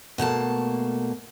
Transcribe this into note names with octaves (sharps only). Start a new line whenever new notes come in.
B2 A3 A#3 A5